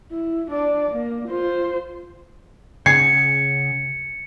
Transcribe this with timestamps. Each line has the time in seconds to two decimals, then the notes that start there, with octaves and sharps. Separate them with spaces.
0.11 E4
0.51 D4 D5
0.91 A#3
1.28 F4 C5
2.86 C#3 G#4 F#5 G#6 C7 C#7